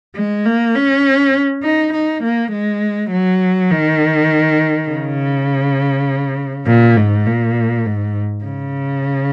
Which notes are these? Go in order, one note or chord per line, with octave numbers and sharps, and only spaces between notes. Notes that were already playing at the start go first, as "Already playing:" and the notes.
G#3
A#3
C#4
D#4
D#4
A#3
G#3
F#3
D#3
C#3
A#2
G#2
A#2
G#2
C#3